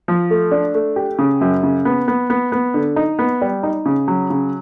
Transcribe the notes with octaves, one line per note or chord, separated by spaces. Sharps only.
F3
A3
D4
A3
G4
C#3
F#2
C#3
B3
B3
B3
B3
D3
D#4
B3
G3
D#4
C#3
F#3
C#3